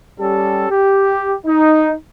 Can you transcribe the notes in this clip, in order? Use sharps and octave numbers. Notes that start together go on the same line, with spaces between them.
G3 C#4 G4 A4
G4
D#4